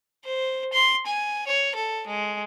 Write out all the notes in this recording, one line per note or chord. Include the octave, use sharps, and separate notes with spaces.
C5
C6
G#5
C#5
A4
G#3